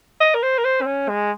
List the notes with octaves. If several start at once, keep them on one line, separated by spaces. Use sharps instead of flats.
D#5
A#4
C5
A#4
C5
C4
C#4
G#3